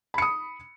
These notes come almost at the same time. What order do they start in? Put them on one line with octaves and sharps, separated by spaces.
B5 C#7 D#6